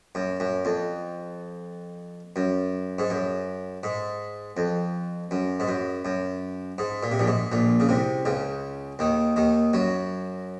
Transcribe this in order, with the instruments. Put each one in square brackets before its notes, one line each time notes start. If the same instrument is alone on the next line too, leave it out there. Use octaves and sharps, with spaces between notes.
[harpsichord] F#2
F#2
F2
F#2
G#2
F#2
G#2
F2
F#2
G#2
F#2
F#2
G#2
A#2
C3
A#1 A#2
G#2
A#1 A#2
C#3
C2 C3
C#2 C#3
D#2 D#3
D#2 D#3
F#2 F#3